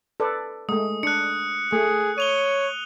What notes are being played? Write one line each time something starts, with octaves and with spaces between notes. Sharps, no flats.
A4 B4 D5
G#3 A3 D#6
D4 F#6 C#7
A3 G#4
C#5 D#7 F7 G7